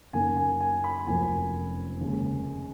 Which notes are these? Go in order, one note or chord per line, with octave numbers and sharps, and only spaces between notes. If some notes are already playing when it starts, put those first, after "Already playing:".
F#1 F#2 D#3 F#3 A#3 G#5
G#5
G#5
B5
F1 F2 F3 A#3 G#5
D#2 C#3 G#3